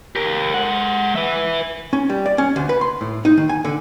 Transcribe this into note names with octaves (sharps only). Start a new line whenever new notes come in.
G4 A#4
G#3 F#5
B4 E5
C#4
G3
D5
C#4
D2
B4
C6
A2
D#4
D#3
G#5
D3